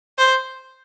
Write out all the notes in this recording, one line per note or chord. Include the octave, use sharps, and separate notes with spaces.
C5